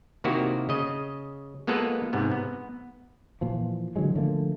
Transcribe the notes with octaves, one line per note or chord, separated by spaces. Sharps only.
C3 D#3 A#3 E4 F#4 G4
C#3 D#5
G#3 A#3 B3 F4 A4 B4
G#2 C3 B3
B3
A#2 E3 F3
D3 E3 F#3 G#3
D3 F3 A3 A#3